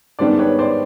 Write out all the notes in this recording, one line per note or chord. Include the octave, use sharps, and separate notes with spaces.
G#2 D#3 G3 B3 D4 C5 D5
B4 C#5
C5 D5